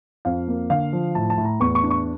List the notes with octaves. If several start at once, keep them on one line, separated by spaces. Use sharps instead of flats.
F2 F5
A#3
D3 F5
F3
A2 A5
A5
A2
A#5
E2 C#6
C#6
D4
C#6